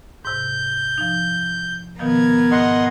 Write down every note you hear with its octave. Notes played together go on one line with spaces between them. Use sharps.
G#2 C3 G6
F3 D#4
B2 D#3 F3 B3 A#4 G#6
G#2 D#5 F#5 C6